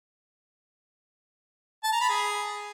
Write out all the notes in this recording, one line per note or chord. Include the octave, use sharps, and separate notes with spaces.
A5
A#5
B5
G#4